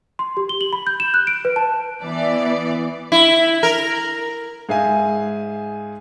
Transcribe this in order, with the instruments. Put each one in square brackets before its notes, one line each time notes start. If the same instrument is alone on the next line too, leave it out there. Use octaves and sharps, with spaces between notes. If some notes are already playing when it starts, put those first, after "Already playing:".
[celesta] C6
G4
G7
F#7
B5
G6
E7
F#6
D7
B4
A5
[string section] E3 B3 D5
[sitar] E4
A#4
[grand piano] G#2 G#4 E5 F5 G#5